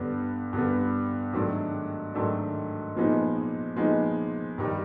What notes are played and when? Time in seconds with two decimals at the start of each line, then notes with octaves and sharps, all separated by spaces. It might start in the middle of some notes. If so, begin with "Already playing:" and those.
Already playing: G2 D3 G3 B3
0.53 G2 D3 G3 B3
1.33 G#2 D#3 F#3 A3 D4
2.14 G#2 D#3 F#3 A3 D4
2.95 A#2 F3 G#3 B3 D#4
3.76 A#2 F3 G#3 B3 D#4
4.58 G2 D#3 G3